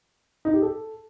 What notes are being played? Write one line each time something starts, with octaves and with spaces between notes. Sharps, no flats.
D#4
G4
A4